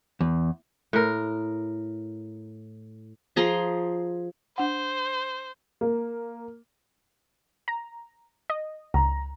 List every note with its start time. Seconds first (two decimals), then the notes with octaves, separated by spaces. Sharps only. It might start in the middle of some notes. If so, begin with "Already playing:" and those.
0.21 E2
0.93 A2 A#4
3.36 F3 G#4 A#5 C6
4.58 D4 C5 F#5
5.81 A#3
7.68 A#5
8.50 D#5
8.94 C#2 A#5